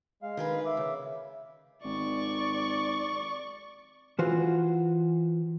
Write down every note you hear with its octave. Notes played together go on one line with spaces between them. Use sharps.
G#3 F5
D#3 G#4 B4
E5 D6
C#3
G#1 D5 C#6
E3 F4 F#4 C5